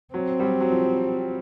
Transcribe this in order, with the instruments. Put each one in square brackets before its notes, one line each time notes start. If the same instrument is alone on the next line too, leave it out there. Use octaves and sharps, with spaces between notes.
[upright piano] F#3 [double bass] C4
[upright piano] G3
F#3
F#3
F3